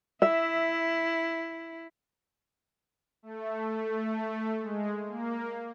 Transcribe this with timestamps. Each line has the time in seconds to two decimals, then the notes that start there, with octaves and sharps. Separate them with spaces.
0.22 E4 E5
3.23 A3
4.62 G#3
5.08 A#3